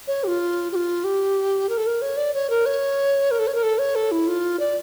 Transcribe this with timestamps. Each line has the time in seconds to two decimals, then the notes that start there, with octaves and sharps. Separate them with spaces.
0.07 C#5
0.24 G4
0.28 F4
0.72 G4
0.76 F4
1.04 G4
1.69 A#4
1.78 A4
1.87 A#4
2.02 C#5
2.17 D5
2.34 C#5
2.50 A#4
2.66 C#5
3.31 A#4
3.39 A4
3.47 C#5
3.55 A#4
3.63 A4
3.78 C#5
3.95 A4
4.12 E4
4.27 F4
4.60 D5